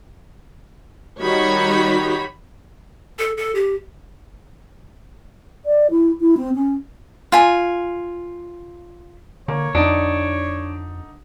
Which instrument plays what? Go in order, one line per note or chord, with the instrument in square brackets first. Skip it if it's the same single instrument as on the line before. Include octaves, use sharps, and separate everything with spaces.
[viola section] D#3 G3 D#4 F#4 C#5 B5
[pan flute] A4
A4
G4
[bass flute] D5
E4
E4
C4
C#4
[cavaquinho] F4 G#5
[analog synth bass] D3 [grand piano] A#3 [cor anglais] C#5
[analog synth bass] F2 [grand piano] D3 D#4 C#7 [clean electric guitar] D4